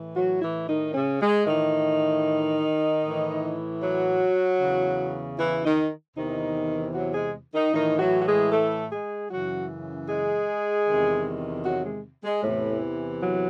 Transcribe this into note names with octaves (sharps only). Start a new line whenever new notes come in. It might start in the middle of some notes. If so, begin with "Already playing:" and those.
Already playing: A2 E3
F#3 F#4
E3 E4
D#3 D#4
C#3 C#4
G#3
A2 D#3 E3 D#4
A2 E3
F#3 F#4
E2 C#3 E3
E3 E4
D#3 D#4
E2 C3 D#3 E3 D#4
F#3 F#4
G#3 G#4
D#3 D#4
A2 D#3 E3 D#4
F#3 F#4
F#4
G#3 G#4
A3 A4
G#3 G#4
F#2 C#3 E3 F#3 F#4
G#3 G#4
E2 C3 D#3
F#3 F#4
G#3
G#3
E2 A2 C3 E3 A3
F#3